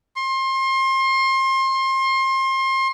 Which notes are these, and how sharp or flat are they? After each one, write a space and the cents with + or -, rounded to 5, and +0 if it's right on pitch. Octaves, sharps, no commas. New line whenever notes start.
C6 +30